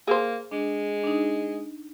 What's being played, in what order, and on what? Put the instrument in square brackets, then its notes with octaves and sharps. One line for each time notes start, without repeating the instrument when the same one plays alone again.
[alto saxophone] A#3 [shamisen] G#4 C5
[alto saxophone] G#3 [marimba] D4
[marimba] D4 D#4